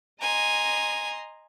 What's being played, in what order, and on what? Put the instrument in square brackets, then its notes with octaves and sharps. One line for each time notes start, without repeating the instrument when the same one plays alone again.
[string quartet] D#5 A#5 C6 [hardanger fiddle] G#5